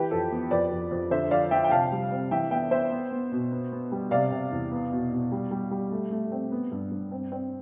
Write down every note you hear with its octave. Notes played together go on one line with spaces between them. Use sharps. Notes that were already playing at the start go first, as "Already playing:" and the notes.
Already playing: E3 G4 B4
F2 A4
B3
F2 B4 D5
F2
F2
D3 C5 E5
F3 D5 F5
F3 E5 G5
G5
C3 F5 A5
G3
C4
E3 E5 G5
B3 E5 G5
B3 C5 E5
B3
B3
B2
B3
B3
G3
C3 D5 F5
C3
E2
B3
B2
B2
G3
G3
G3
A3
A3
C4
B3
G2
G2
C4
C4